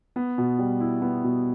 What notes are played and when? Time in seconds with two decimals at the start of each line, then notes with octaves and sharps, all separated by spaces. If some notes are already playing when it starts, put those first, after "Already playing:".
0.16 B3
0.38 B2
0.59 G3
0.80 E4
1.02 B3
1.24 B2